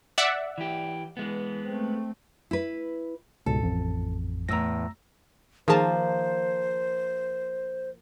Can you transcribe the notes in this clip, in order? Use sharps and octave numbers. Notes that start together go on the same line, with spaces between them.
D5 E5 F#5
E3 G4
E3 G#3 B3
A3 C4
E4 B4
C#2 G#2 B2 A4
A1 F2
E2 A2 A#5 E6 A#6
D#3 F3 A#3 G#4 C5 A5